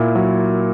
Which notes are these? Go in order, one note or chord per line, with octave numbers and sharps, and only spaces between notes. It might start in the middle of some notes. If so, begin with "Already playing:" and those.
Already playing: A#2 A#3 E4
F#3